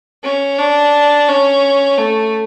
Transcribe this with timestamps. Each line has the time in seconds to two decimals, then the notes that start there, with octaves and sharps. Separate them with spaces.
0.24 C#4
0.59 D4
1.28 C#4
1.97 A3